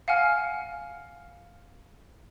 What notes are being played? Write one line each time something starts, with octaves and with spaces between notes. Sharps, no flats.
F5 F#5 G#5 F6